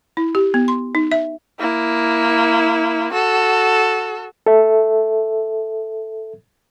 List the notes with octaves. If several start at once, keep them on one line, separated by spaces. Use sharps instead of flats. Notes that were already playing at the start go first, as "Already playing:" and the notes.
E4
G4
B3
C6
D#4
E5
A#3 E4
F#4 A4
A4 E5